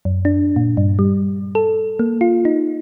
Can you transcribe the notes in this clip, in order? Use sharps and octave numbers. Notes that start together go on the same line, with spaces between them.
F#2
D4
A#2
G2
G3
A4
A#3
F4
D#4